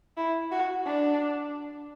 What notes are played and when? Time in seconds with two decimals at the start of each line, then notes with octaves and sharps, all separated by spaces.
0.17 E4
0.51 F#4
0.86 D4